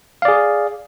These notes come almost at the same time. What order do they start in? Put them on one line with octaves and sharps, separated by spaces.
F5 D5 G#4